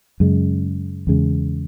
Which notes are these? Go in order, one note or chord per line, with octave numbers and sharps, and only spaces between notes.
F#2 C#3 G#3
E2 C#3 G#3